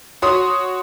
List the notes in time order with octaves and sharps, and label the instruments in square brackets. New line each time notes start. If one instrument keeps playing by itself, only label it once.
[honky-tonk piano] F#4 C#5 C6 D#6